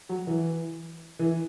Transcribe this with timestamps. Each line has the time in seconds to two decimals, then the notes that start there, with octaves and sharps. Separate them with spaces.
0.09 F#3
0.27 E3
1.19 E3